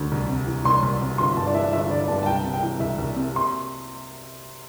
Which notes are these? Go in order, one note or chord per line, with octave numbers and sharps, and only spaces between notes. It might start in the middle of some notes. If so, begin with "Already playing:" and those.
Already playing: D2
C2
C3
E3
C2 C6
C2
C3
G1 C6
G2 A5
D5
E3 E5
G1 E5
G1 D5
G2 A5
A5
C2 G5
C3
G5
E3
C2 E5
C2
C3
C6